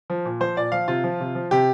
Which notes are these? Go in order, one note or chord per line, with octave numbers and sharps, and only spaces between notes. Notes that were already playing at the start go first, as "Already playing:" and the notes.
F3
A#2
F3 C5
A#2 D5
F3 F5
C3 F4
F3
C3
F3
C3 G4